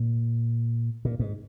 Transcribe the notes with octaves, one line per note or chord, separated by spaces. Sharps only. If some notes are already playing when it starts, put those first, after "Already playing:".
Already playing: A#2
A#2
G#2